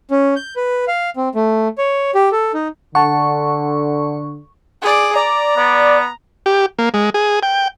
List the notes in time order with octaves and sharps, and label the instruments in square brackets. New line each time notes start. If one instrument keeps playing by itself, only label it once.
[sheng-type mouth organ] C#4
G6
B4
F5
C4
A3
C#5
G4
A4
D#4
[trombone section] D3 [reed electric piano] F#5 A5 [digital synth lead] C#6
[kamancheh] G#4 D5
[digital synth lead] D5 [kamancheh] A#5
[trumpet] B3 [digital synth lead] D5
[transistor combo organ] G4
A#3
G#3
G#4
G5